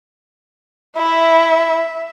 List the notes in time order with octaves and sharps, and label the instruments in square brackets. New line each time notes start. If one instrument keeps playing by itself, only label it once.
[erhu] E4 [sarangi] E5